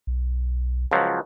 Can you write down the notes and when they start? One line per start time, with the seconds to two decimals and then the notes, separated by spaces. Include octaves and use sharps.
0.07 B1
0.91 C#2 F3 F#3